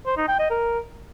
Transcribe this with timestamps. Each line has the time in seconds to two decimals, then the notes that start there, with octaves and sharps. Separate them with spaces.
0.06 C5
0.17 D#4
0.28 G5
0.39 D#5
0.50 A#4